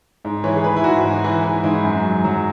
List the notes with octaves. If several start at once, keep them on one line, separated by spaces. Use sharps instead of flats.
G#2
E3 C#5
G#4
E3 B4
E4
G#2 F#4
G#2
E3
E3
G#2
F#2
F#3
F#3